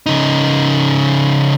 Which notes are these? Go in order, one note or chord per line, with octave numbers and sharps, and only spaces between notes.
C#3 D#4